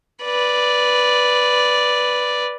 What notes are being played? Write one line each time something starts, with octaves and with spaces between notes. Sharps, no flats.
B4 D5